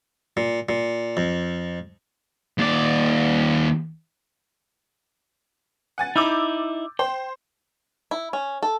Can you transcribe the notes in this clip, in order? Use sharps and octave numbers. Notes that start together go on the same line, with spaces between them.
A#2
A#2
F2
D#2 D5
F#5 G#5 A6
D#4 E4 D6 E6 G6
C5 G5
E4
C#4
A4